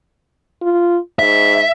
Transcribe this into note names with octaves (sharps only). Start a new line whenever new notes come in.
F4
G#2 E5